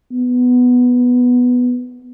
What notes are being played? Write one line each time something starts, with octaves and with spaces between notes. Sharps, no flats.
B3